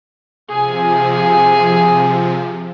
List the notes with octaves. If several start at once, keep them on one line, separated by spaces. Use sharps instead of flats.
C3 F3 G#4 G#5